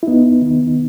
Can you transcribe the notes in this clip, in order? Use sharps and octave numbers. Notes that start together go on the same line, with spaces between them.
E4
E2 B3 D#4
D#3